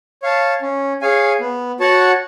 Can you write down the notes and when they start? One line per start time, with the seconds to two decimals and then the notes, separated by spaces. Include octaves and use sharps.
0.22 C#5 F5 A5
0.62 C#4
1.01 G#4 C#5 F5 G#5
1.40 B3
1.80 F#4 C#5 F#5 A5